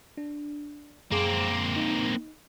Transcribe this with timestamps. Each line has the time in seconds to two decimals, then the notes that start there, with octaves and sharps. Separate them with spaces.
0.17 D4
1.11 F#2 A#3 C4 G#4 D6
1.76 D#4